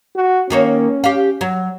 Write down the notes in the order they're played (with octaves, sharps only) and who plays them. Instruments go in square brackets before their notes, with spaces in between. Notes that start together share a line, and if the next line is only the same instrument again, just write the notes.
[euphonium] F#4
[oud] D#3 A#3 C#5 [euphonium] C#4
[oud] G4 F5
F#3